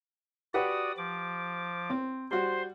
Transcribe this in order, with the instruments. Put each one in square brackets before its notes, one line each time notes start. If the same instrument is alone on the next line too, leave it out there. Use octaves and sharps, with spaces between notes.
[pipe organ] F#4 D5 D#6 [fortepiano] G4 B4 F#5
[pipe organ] F3 D6
[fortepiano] C4
[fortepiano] G3 F#4 [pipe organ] C5 C6